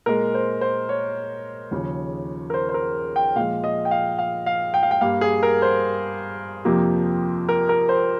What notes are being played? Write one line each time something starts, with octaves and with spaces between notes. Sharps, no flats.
A#2 G#3 A#4
C5
C5
C#5
D#2 C#3 F3
A#4
C5
C5
A#4
G5
A#2 F3 G#3 F5
D#5
G5
F5
F5
F5
G5
F5
G5
G2 G3 A#3 F5
G#4
A#4
C5
F2 C3 F3 A#3
A#4
A#4
C5